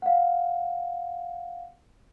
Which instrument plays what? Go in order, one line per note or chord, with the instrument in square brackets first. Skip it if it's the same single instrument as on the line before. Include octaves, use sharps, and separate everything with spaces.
[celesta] F5 F#5